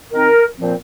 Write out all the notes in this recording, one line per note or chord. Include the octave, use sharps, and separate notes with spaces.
D#3 C4 D#4 A#4
A#2 F3 C4